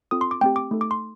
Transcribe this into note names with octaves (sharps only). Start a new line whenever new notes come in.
C4 F4 A4 D#6
C6
D6
A3 C4 G4 G5
D6
A3 D#4 A4
D6
C6